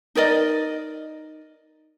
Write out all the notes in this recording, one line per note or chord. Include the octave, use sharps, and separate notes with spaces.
D#4 A#4 D5 D#5